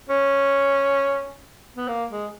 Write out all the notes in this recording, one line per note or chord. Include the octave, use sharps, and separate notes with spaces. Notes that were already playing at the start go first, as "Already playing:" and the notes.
C#4
B3
A#3
G#3